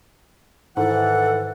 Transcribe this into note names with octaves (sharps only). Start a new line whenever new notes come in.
G#2 D#3 E3 A4 F#5